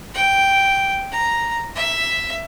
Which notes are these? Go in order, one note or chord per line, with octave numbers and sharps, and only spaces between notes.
G5
A#5
E5